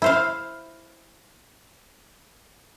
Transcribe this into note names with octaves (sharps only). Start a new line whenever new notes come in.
E4 C5 F5